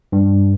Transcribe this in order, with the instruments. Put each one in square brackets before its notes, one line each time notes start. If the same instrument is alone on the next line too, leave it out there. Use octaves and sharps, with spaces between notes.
[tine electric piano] G2